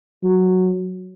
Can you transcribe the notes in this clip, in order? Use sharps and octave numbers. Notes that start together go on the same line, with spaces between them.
F#3